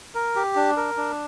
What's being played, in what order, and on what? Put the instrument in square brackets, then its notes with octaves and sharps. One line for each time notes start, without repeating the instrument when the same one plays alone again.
[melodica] A#4
G4
D4
A#4
D4